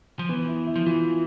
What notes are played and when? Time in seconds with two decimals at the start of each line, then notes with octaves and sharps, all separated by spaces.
0.19 F3
0.29 E3 B3
0.48 E4
0.67 E4
0.76 F3
0.86 E3 F4